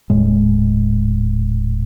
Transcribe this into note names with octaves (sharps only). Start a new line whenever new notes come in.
D#1 A2 G#3